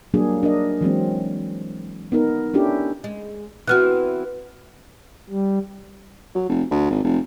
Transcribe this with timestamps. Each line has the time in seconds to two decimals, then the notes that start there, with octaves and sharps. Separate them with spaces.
0.14 F#3 G3 A#3 D4 G#4
0.43 D4 A#4 D#5
0.81 E3 F#3 G#3 C4
2.12 B3 D#4 A#4
2.54 C#4 D4 E4 G4 A4
3.04 G#3
3.68 E3 B3 C4 F#4 F6 F#6
5.30 G3
6.35 F#3
6.49 F1
6.71 D2
6.90 G#1
7.04 F1